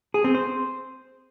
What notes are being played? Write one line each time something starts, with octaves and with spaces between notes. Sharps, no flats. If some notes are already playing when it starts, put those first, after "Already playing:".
G#4
C4
C5